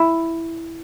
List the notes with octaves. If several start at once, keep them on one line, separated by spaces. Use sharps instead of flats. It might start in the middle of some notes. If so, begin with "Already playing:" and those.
Already playing: E4